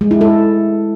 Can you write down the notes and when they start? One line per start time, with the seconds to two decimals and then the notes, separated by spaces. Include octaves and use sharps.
0.01 G#3
0.11 E4
0.21 A4